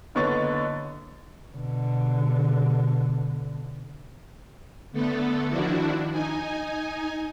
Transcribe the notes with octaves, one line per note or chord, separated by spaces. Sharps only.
F#1 D3 B3 C#5 C#6 A6
B2 D3
D3 A3 B3 A4
D#3 F3 D4 E4 F#4
D#4 G#5